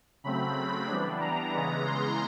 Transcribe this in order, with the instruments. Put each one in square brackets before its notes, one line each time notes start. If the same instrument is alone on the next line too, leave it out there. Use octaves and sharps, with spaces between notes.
[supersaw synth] C#3 F#3 A3 C4 B5
E3 G3 B3 D4
A#5
C#3 E3 G#3 B3
C6